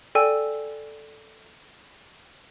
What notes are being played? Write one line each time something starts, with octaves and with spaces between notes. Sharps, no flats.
A4 D5 G5 G#5 E6 D#7